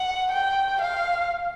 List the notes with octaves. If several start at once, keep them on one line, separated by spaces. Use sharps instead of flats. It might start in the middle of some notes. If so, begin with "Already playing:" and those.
Already playing: F#5
G5
F5